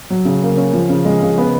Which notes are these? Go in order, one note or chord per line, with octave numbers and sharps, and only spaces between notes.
F#3
C#3
A#3
C#4
F3
C#3
G#3
C#3
B3